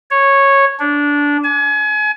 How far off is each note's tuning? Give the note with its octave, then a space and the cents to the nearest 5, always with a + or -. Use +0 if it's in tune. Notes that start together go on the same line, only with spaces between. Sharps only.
C#5 -10
D4 -15
G#5 +35